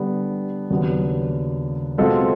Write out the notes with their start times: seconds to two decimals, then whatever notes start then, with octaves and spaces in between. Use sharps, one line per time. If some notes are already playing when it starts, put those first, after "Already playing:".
Already playing: D3 G3 B3 D4 G4
0.70 D#2 C#3 F#3 B3 D4
1.98 B2 G#3 C4 F4 A4